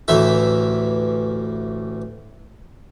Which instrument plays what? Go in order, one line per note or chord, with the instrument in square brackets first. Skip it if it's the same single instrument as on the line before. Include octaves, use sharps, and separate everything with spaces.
[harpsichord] A1 D2 E3 E5